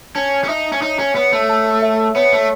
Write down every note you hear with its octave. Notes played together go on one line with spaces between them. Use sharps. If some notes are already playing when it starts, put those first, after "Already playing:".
C#4 A5
C#4
D#4 E5
C#4
D#4 C#5
C#4
B3 C#5
A3
A5
E5
B3 C#5
A3